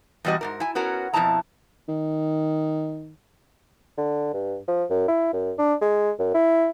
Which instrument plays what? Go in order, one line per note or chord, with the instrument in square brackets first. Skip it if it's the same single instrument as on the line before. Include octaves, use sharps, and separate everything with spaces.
[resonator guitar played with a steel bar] E2 B2 G3 F#4 D#5
G#2 B2 A#4
E4 G#5
B3 C#4 F#4 A#4
F2 G#2 B2 E4 A5 A#5
[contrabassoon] D#3
[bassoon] D3
G2
F3
F#2
E4
F#2
D4
G#3
F#2
E4